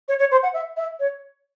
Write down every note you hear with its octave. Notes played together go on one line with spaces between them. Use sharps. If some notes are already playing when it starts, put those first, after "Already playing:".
C#5
C#5
C5
F#5
E5
E5
C#5